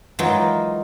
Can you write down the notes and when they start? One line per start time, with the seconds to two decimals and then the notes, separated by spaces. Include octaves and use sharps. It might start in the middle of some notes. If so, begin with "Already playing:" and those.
0.19 E3 F#3 G#3 D#4 F4 A#4